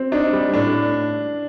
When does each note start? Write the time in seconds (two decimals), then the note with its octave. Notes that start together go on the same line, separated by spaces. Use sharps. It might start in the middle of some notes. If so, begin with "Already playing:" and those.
Already playing: C4
0.12 D4 D#4
0.33 G3
0.54 A2 D4